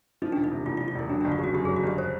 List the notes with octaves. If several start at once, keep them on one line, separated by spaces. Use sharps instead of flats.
F3 D#4
E1 D4
D#4
C3
E2 F4
F4
F3
F4
E1 E4
F#3 D4
D4
G1
F4
C#3 F#4 G4
F#2 G4
G#4
F#3
F#4
G1 G4
C5